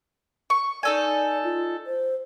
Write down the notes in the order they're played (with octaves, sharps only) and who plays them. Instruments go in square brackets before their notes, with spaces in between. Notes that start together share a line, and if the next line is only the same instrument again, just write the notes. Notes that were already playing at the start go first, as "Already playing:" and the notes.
[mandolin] C#6
[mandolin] D#4 A4 G#5 [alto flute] D5
[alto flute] F4
C5